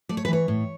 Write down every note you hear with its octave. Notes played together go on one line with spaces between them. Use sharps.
A3 D5
C#5
B4
E3 C#5
A2